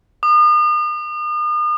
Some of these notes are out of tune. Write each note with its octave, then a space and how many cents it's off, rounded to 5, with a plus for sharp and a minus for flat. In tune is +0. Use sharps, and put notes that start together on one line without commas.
D#6 -40